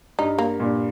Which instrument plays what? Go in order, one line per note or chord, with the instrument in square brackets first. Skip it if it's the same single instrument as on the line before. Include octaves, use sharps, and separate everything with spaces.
[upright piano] G2 [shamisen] D#4
[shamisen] A#3
[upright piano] G2 A#2